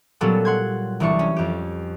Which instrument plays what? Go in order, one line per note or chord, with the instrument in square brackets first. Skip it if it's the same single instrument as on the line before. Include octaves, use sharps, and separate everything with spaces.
[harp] A#2 F#3 G3 B3 C#4 A4
F#5 C6 G#6
C2 E3 G3 D4 C#6
C#4
F2 G4